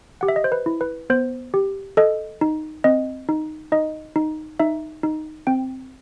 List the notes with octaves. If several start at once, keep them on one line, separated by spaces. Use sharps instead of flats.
G4 F#5
E5
D#5
C5
B4
E4
B4
B3 C5
G4
A4 D#5
D#4
C4 D#5
D#4
D#4 D#5
D#4
D#4 E5
D#4
C4 G5